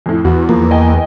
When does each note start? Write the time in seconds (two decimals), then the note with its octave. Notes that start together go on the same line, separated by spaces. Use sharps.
0.06 F2 A2
0.25 E2 F#4
0.49 F3 A#3
0.71 D#5 G5 G#5